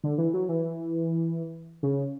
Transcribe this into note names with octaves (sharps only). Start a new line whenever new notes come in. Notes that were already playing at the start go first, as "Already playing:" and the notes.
D3
E3
F#3
E3
C#3